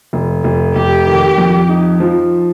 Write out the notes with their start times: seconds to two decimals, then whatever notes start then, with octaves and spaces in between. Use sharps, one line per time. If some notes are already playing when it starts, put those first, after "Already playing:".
0.13 F1
0.44 F1
0.75 F1 G4
1.07 D#3
1.38 F2
1.69 D#4
2.00 F3